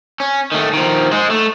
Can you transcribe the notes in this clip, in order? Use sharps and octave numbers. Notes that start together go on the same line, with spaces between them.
C#4
D#3 A3
D#3 F3
G#3 C5
A3